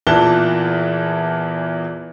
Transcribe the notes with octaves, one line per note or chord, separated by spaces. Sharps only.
E2 A#2 E3 A5 F#6 G7